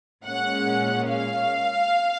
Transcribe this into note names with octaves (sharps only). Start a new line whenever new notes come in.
A#2 G#3 C#4 F#5
F5